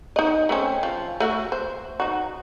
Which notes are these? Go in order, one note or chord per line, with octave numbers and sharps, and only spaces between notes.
D#4 D#5
A3 C4 C#4
F3
A3 F#4 E5
C5
D#4 F#4